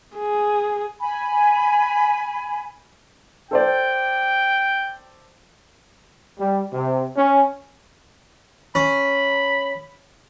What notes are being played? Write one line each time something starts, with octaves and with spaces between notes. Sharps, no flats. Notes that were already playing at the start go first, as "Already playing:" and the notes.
G#4
G#5 B5
A4 C5 D5 G5
G3
C3
C#4
C#4 B5